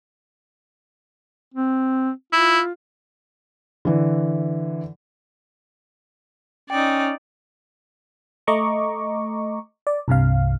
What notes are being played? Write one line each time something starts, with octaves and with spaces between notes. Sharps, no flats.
C4
E4 F4
D3 E3
C#4 D#4 D5 G5
A3 D#5 A#5 C#6 D6
D5
C2 G2 C3 F5